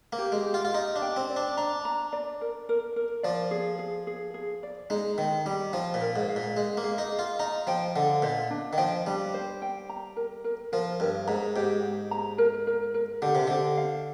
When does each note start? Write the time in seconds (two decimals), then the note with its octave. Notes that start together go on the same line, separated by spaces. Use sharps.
0.13 A#3
0.18 G4
0.32 G#3
0.46 G4
0.54 F4
0.65 F4
0.74 D#4 G4
0.96 D4
1.02 G5
1.16 C4
1.30 D5
1.36 D4
1.57 D4 A#5
1.85 A#5
2.13 D5
2.41 A#4
2.69 A#4
2.96 A#4
3.23 F3 D5
3.51 G#4
3.79 G#4
4.07 G#4
4.34 G#4
4.63 D5
4.90 G#3 D#4
5.18 D#3 D#4
5.45 G3 D#4
5.73 F3 D#4
5.94 A#2
6.01 A#4
6.16 G#2
6.29 F5
6.36 A#2
6.57 G#3 D#5
6.77 A#3
6.84 G#4
6.98 D#4
7.12 G#4
7.19 F4
7.39 D#4 A#5
7.67 F3 G5
7.96 D3 D#5
8.22 A#2 C5
8.51 D4
8.73 D#3
8.78 F3 G5
9.07 G3 D4
9.34 C5
9.62 G5
9.90 A#5
10.16 A#4
10.44 A#4
10.72 F3 A#4
11.00 G2 A#4
11.27 G#2 A#5
11.56 G#2 G4
11.84 G4
12.11 A#5
12.38 A#4
12.67 A#4
12.94 A#4
13.22 D3 G4
13.35 C3
13.47 D3 G4
13.77 F5